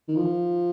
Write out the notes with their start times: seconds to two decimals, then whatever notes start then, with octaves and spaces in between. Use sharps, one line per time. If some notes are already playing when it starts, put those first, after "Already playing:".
0.08 D#3
0.16 F3